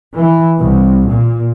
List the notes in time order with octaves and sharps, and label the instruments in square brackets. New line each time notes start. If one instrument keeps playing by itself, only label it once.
[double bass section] E3
C2
A#2